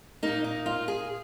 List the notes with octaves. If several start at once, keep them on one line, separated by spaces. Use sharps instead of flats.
A#2 A#3 D#4
D#4
F4
G#4